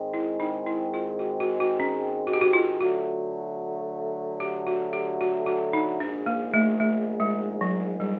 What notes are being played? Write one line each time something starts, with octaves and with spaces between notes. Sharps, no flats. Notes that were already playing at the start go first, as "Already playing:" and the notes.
Already playing: G#2 D#3 G#3 C4
E4
D#4
E4
F4
F#4
F#4
F#4
C#4
F#4
G4
F#4
F4
D3 F#3 A3 F#4
G4
F#4
G4
F#4
F#4
D#4
A#1 G#2 D#3 D4
A#3
A3
A3
G#3
F#3
G3